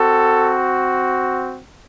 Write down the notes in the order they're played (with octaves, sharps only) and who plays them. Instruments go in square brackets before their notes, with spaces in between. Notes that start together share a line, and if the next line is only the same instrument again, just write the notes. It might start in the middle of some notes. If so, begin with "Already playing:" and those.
Already playing: [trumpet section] C4 F#4 A4